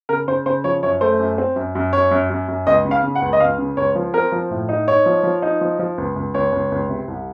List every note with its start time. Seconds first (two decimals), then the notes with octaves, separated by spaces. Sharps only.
0.09 C#3 A#4
0.28 C#3 C5
0.46 C#3 C5
0.64 F3 C#5
0.83 F#2 C#5
1.01 A3 C5
1.19 F#2
1.38 C4
1.56 F#2
1.75 F#2
1.93 F#2 C#5
2.11 F#2
2.30 F#2
2.48 F#2
2.67 C#2 D#5
2.85 C#3
2.91 F5
3.03 C#3
3.15 F#5
3.22 C#2
3.33 D#5
3.40 C#2 F5
3.58 C#3
3.77 C#2 C#5
3.95 F3
4.14 C4 A#4
4.32 F3
4.51 A2
4.69 D#4
4.87 D#4 C#5
5.06 F3
5.23 F3
5.42 D#4
5.61 F3
5.79 F3
5.98 C#2
6.16 C#2
6.34 C#2 C#5
6.52 C#2
6.72 C#2
6.89 C3
7.08 C2